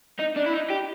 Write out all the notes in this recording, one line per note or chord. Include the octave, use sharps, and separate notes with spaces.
D#4
D4
E4
D#4
G4